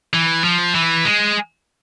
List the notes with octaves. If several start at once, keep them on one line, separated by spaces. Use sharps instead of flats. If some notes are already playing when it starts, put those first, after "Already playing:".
E3
F3
E3
G#3